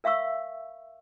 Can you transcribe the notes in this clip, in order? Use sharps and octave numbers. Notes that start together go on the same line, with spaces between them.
A#4 E5 F5 C#6 E6